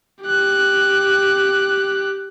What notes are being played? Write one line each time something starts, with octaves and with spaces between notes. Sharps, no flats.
G4 F#6